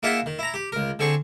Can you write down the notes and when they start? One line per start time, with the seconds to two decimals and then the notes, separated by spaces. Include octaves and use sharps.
0.03 A#3 D#4 F4 G#4 E5 F#5
0.26 D#3
0.39 E4 A#5
0.54 G4
0.72 C#2 A#4
0.99 D3 C4 G#4 C#6